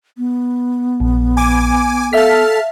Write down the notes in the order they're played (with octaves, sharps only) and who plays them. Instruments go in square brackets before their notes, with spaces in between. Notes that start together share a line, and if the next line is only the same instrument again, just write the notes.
[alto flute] B3
[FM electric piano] A#1
[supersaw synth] G#5 D6
[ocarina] A4 [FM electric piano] E5 F5 B6 [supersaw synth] A5 F6